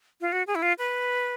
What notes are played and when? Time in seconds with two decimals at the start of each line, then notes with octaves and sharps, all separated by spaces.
0.21 F4
0.32 F#4
0.47 G#4
0.55 E4
0.62 F4
0.78 B4